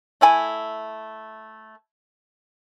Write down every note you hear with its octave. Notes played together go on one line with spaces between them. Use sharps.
A3 E4 G#5